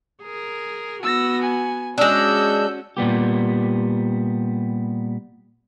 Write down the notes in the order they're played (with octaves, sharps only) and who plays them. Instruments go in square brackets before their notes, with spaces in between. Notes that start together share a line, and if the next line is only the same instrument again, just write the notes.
[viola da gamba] G#4 A#4
[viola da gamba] B3 F#4 [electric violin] E6 A#6
[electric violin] G#5
[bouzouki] G#3 D4 [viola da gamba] C#4 F#4 [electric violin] E6 G6
[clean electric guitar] A#2 G3 B3 G4